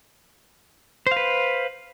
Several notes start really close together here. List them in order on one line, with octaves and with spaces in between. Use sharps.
C5 F5 B4